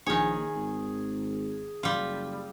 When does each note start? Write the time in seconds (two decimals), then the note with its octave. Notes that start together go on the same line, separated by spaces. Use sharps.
0.06 A#1 D#3 G#4 C#5
0.55 G#1
1.83 F#1 G3 F4